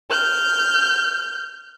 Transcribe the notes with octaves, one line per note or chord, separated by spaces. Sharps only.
F6 G6